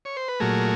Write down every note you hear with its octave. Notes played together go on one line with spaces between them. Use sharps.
C#5
C5
B4
A#2 F#3 A3 G#4 A#4